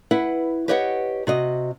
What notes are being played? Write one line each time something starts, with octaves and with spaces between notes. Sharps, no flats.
E4 B4 F#5
G4 B4 C#5 D#5 F5 F#5
C3 F#4 D#5